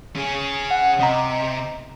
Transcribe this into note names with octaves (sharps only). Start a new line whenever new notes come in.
C#4 G#4
F#5
C3 D#5 A#5